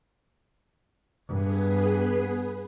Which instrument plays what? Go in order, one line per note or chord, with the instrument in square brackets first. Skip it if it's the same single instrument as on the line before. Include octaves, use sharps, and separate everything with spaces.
[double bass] G2 [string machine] B3 G#4 B4